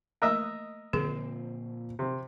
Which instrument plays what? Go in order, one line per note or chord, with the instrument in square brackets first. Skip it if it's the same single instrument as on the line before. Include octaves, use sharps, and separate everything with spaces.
[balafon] A3 A#3 [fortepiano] A#4 D#5 E5
[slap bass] A#2 F3 C4 [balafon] D3 G#4
[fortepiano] C3